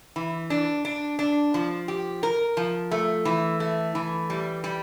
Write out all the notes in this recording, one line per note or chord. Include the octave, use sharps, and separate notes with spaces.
E3
D4
D4
D4
F3
G4
A#4
F3
A3
E3
A3
E3
G3
G3